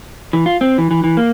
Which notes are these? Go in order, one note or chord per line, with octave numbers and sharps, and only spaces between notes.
E3
F4
C4
E3
E3
E3
A#3